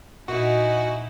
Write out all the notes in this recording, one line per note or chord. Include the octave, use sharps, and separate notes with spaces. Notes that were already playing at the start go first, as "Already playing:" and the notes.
A#2 D#4 E4 F#4 D#5 G#5